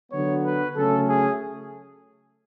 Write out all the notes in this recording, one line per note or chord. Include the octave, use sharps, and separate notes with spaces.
D3 F#3 B3 C#5
B4
C#3 F#3 A3 C#4 A4
G#4